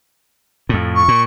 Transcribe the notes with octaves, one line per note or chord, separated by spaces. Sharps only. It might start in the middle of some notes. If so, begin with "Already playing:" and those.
F2 A2
C#6
A#2